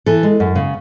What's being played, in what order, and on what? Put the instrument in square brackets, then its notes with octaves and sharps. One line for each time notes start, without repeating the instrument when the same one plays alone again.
[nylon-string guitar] E3 A4
G#3
F#2
C#3